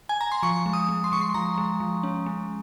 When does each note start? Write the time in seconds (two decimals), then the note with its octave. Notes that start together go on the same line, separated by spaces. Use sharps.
0.09 G#5
0.21 A#5
0.32 C6
0.43 F3 C#6
0.66 G#3
0.73 D#6
0.89 G#3
1.04 C6
1.12 G#3 C#6
1.21 C6
1.34 F3 A#5
1.58 G#3
1.80 F3
2.03 C#4
2.26 G#3